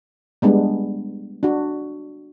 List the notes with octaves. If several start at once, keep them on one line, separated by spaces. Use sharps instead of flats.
G3 G#3 B3 D4
D4 F#4